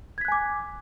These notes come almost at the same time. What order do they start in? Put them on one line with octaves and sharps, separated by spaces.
G#6 B6 F#6 G#5 D6